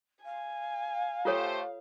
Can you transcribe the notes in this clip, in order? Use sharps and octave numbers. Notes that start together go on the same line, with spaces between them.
F5 G#5
A3 F4 G4 A4 C5 C#5